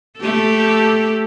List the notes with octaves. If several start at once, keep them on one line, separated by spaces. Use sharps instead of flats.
A3 G4 A4